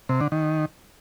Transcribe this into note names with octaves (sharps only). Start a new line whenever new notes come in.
C3
D3
D#3